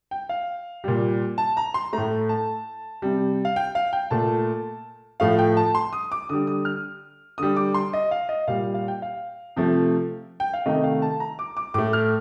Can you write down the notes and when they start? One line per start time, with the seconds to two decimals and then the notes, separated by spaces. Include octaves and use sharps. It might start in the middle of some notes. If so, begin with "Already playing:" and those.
0.11 G5
0.29 F5
0.84 A#2 G3
1.38 A5
1.57 A#5
1.74 C6
1.93 A2 A3 A#5
2.29 A5
3.02 C3 G3
3.45 F5
3.56 G5
3.75 F5
3.93 G5
4.11 A#2 A3 A5
5.20 A2 F3 A3 F5
5.39 G5
5.57 A5
5.75 C6
5.93 D#6
6.12 D6
6.29 D3 G3 D#6
6.47 D#6
6.65 F6
7.38 D3 G3 D#6
7.57 D6
7.74 C6
7.93 D#5
8.11 F5
8.29 D#5
8.47 A#2 G3 F5
8.74 F5
8.88 G5
9.02 F5
9.57 C3 F3 A3
10.40 G5
10.54 F5
10.66 C3 D#3 A3 D#5
10.84 F5
11.02 A5
11.20 A#5
11.39 D6
11.57 D6
11.74 A2 A3 D6
11.93 F6